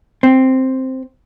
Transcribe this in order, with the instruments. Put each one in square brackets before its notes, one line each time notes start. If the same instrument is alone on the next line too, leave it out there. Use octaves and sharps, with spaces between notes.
[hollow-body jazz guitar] C4